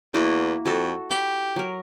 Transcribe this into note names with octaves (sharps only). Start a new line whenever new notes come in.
E2 A#3 E4 F#4
F2 F#4 A4
G4 B5 D6
F#3 A#4